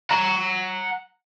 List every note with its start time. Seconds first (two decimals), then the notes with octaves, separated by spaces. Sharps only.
0.10 F#5 A#5